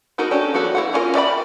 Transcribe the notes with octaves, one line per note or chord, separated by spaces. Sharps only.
B3 D#4 F#4 A4 A#4
C#4 D4 G4 A4
F3 A#3 B3 F#4 A4
E4 F5 F#5
A#3 C#4 D4 F4 A#4
D5 E5 G5 A5 B5